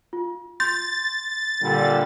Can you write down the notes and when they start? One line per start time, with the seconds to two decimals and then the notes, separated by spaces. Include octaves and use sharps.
0.13 F4
0.60 C6 G6 A6
1.62 A#2 D3 G3